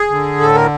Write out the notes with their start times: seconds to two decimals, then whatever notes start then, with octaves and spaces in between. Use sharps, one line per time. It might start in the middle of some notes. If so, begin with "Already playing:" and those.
Already playing: G#4
0.10 D3
0.40 A2 A4
0.55 A#4